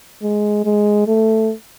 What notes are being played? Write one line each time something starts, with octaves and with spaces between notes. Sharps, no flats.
G#3
G#3
A3